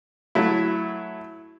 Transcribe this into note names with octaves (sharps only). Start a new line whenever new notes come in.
F#3 A3 E4